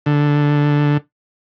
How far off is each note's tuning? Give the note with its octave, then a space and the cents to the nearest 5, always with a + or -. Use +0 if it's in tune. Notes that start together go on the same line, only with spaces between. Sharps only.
D3 -5